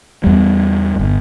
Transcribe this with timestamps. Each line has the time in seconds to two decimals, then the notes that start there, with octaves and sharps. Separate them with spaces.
0.24 E2 G3
0.99 G1